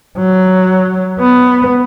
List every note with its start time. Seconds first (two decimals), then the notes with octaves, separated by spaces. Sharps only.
0.18 F#3
1.19 B3